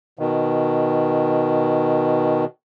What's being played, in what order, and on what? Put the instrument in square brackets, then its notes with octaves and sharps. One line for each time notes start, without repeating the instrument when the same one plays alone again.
[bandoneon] B2 D#3